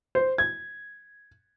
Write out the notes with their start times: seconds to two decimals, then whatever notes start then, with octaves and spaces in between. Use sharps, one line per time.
0.15 C5
0.38 G#6